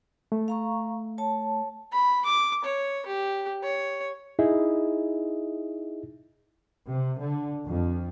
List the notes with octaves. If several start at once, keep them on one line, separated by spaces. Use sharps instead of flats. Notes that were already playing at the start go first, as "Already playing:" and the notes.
A3
F5 A#5 C#6
C#5 A5
B5
D6
C#5
G4
C#5
D#4 E4 G#4 D#5 E5
C3
D3
F2